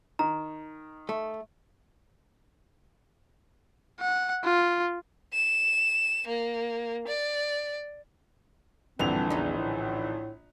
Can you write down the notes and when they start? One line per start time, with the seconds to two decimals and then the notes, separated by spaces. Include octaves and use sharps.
0.19 D#3 A#5
1.09 A3
4.01 F#5
4.44 F4
5.34 E7
6.27 A#3
7.08 D5
8.99 A#1 G2 D3 E3 C4 F7
9.30 E2 C#4 D#4
9.57 A2